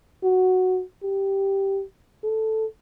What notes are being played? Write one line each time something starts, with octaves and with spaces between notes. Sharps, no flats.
F#4
G4
A4